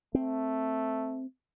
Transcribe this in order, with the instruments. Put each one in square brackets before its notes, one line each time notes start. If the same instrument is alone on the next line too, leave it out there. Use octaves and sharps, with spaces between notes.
[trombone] A3 [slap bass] C4